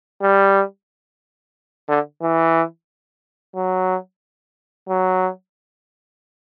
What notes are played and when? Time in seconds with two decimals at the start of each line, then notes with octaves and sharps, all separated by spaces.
0.22 G3
1.89 D3
2.22 E3
3.56 F#3
4.89 F#3